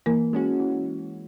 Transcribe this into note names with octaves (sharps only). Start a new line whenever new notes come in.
E3 A#3 A#4
G#3 C#4 F#4
E3